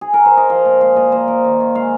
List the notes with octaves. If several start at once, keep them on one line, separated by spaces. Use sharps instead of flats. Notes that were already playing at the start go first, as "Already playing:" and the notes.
G#4
A#4
C5
D#5
F3 F5
A#2
G#3 F5
A#2 D#5
A#3 C5
A#3 A#4
D#3
D#3
G#3 F5